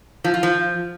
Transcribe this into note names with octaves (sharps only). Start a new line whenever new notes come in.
F3
F4
F3